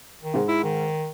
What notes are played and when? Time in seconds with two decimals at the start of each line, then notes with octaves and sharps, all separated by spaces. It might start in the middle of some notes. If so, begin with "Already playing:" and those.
0.22 D#3
0.34 G#2 G#3
0.48 E4
0.63 D#3